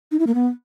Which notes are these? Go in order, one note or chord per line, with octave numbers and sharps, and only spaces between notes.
D#4
E4
A#3
B3